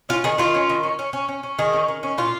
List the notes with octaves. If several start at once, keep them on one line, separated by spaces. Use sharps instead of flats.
C#4 F4
D#3 G#4
D#3 F4
C#4
D#3
C#4
C#4
C#4
C#4
C#4
D#3 G#4
C#4
D#3
C#4
A#2 F4